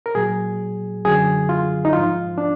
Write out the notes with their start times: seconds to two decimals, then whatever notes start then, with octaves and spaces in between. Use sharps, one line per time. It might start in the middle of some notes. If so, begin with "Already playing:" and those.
0.06 A#4
0.15 A#2 F#3 G#4
1.05 F#2 D3 F#3 G#4
1.49 F4
1.85 D#4
1.93 G#2 F3 F4
2.38 D4